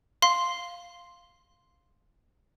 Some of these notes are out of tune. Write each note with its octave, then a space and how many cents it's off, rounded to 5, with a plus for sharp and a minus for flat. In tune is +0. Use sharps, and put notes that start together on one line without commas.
F5 +0 C6 +0